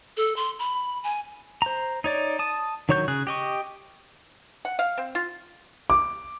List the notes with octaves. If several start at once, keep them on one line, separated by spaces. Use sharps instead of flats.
A4
C6
B5
G#5
C5 A#5
D#4 C#5 D5
A5 D#6
D#3 F#3 C#5 C#6 G6
C#3 G#4 F#6
G4 D#5 C#6
F#5
F5
C4
F4
D6